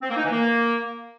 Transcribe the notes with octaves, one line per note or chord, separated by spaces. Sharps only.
C4
A#3
D#4
E3
A#3